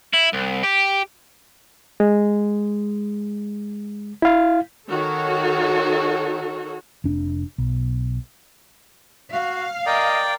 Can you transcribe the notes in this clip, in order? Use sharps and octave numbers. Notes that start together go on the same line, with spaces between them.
E4
C2
G4
G#3
E4 F5
D#3 F#4 A4 C#5
F1 D4
B1
F#4 F5
A#4 D5 D#5 G5